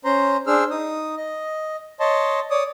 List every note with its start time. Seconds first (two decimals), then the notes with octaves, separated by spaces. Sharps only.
0.05 C#4 C5 A#5 C6
0.47 D4 G#4 C5 E6 F6
0.70 D#4 D#6
1.17 D#5
2.00 C#5 D#5 A5 C6
2.50 C#5 D5 D#6